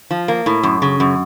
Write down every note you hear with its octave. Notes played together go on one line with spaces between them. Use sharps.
F3
A#3
A2
F#2
C#3
F#2